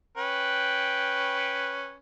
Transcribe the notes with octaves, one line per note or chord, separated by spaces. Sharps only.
C#4 B4 G5